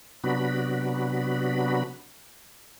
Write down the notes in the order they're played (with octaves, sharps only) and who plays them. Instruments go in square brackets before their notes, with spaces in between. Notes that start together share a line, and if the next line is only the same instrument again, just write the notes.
[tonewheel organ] C3 F#3 B3 D4 F#4 B5